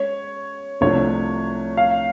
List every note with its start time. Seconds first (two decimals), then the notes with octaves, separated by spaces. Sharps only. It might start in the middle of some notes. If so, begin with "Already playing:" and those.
Already playing: G#3 C#4 C#5
0.81 C2 C3 F3 A3 D4 C#5
1.77 F5